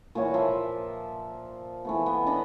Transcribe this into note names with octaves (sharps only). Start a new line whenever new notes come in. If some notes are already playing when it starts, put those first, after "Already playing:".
A#2 E3 C#5 F#5
F3 A#3 E5 C6
E3 A3 B3
B3
D4 D#5 A#5 B5